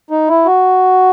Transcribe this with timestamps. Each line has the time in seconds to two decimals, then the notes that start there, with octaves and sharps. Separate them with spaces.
0.10 D#4
0.29 E4
0.46 F#4